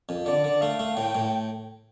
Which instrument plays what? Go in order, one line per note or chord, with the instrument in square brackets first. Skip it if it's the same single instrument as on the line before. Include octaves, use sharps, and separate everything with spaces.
[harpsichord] F2
[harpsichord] D3 [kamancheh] D5
[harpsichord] D3
[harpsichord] A3 [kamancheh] F5
[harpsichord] A3
[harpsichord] A2 [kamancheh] G5
[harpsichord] A2